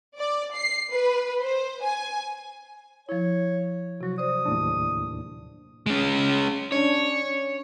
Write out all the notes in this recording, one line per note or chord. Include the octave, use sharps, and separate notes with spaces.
D5
C7
B4
C5
G#5
F3 E4 C#5
C3 F#3 F#4
C5 D5 D#6
D#2 A2 D4
G#3 C#4
C#4 D4 C#5